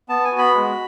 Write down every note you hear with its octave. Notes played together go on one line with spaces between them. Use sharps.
B3 A5
G#5
F#4
B5
G#3